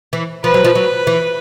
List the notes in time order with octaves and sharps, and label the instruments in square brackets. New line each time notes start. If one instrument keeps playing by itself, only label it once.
[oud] E3
[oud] F3 [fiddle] B4
[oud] F#3
F3
F#3
E3